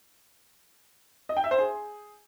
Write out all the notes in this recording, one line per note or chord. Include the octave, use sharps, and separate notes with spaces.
D#5
G5
E5
C5
G#4